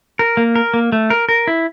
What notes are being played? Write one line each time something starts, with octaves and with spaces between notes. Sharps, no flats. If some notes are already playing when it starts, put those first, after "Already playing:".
A#4
A#3
A#4
A#3
A3
A#4
A#4
E4